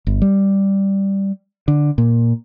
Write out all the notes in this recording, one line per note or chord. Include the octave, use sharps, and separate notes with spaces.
G1
G3
D3
A#2